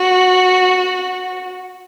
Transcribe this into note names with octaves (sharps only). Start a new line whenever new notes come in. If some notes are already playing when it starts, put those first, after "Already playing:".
Already playing: F#4